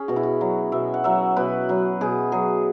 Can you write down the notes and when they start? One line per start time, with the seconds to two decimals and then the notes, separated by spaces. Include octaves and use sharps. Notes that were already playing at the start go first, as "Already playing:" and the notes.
Already playing: C#4 G#4
0.08 B2 F#4
0.16 E4
0.23 F#4
0.41 F#3
0.72 B2 E5
0.94 F#5
1.04 F#3 E5
1.37 B2 B4
1.69 F#3
2.01 B2 G#4
2.32 F#3 G#4